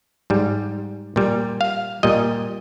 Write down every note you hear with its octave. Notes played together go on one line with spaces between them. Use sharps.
G#2 G3
A#2 G3
F5
A#2 G3 D#5